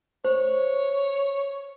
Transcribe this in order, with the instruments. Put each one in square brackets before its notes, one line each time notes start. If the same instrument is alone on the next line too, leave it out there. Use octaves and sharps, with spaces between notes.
[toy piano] C5 [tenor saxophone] C#5